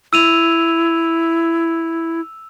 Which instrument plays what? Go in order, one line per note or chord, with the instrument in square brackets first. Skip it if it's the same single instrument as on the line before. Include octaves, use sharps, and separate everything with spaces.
[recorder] E4 [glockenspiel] E6 D#7 F7